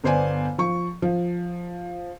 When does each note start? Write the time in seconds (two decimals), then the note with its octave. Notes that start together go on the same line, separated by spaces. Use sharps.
0.04 G1 B3 C5 D5 G#5
0.58 F3 C#6
1.02 F3